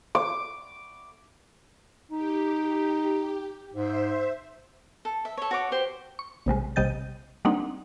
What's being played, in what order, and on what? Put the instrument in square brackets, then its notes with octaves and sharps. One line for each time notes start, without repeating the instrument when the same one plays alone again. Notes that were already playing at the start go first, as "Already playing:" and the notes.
[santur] D6
[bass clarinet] D#4 [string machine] G4
[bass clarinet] G#2 [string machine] C5 E5
[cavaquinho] A4
E5
A4 C#5
F#4 C#5 D6
G4 C5
[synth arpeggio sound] C#6
A#1 C3 G3 G#3
A#1 C3 G3 D#5 G6 A6
G3 A#3 C4 D4 D#4 F#5